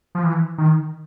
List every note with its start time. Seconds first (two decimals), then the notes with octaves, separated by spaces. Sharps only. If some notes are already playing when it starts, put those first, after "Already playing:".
0.15 F3
0.24 E3
0.58 D#3